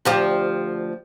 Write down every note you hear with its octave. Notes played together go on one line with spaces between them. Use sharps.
D2 F3 G4